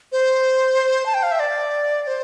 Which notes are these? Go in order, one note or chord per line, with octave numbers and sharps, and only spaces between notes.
C5
A5
G5
F5
E5
D5
D5
C5